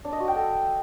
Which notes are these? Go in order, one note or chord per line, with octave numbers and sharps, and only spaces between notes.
D4
D#5
F#4
G5
A4